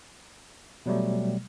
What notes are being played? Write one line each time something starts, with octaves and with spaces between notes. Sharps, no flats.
B2 F#3 G3 A3